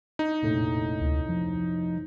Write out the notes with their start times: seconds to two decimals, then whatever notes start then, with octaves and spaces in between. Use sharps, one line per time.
0.19 D#4
0.41 F1 A#1 A2
1.01 D2
1.29 F3